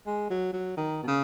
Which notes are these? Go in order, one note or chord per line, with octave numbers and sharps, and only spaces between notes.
G#3
F#3
F#3
D#3
B2
C#3